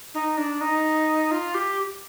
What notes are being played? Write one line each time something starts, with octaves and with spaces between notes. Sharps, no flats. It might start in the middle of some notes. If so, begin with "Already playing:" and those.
D#4
D4
D#4
F4
G4